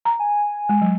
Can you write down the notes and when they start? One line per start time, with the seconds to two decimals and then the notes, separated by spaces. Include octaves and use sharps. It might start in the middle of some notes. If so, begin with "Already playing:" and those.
0.05 A#5
0.19 G#5
0.69 G#3
0.82 F#3